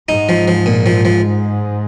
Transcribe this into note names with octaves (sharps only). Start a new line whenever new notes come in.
G#2 D#4
F3
F3
A#2
F3
F3